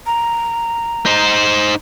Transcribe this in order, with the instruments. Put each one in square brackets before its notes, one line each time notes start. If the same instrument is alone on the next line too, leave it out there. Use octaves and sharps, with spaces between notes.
[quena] A#5
[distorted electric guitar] D#4 C5